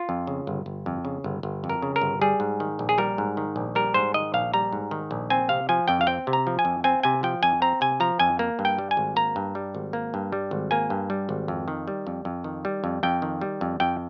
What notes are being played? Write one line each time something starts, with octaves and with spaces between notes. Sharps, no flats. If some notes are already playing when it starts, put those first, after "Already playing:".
Already playing: F4
F2
C#3
G1
G1
F2
C#3
G1
G1
F2
A#4
C#3
A#4
G1
G3 G#4
G#2
D#3
A#1
G#4
G3 A#4
G#2
D#3
A#1
G3 A#4
G#2 C5
D#3 D#5
A#1 F5
G3 A#5
G#2
D#3
A#1
C4 G#5
C3 F5
F3 G#5
F2 G5
F5
C4 G5
C3
A#5
F3
G#5
F2
C4 G#5
C3 G#5
F3 G5
F2 G#5
C4 A#5
C3 G#5
F3 A#5
F2 G#5
A#3
G2
G5
G3
G#5
G#1
A#3 A#5
G2
G3
G#1
A#3
G2
G3
G#1
A#3 G#5
G2
G3
G#1
F2
D#3
G3
F2
F2
D#3
G3
F2
F2 G5
D#3
G3
F2
F2 G5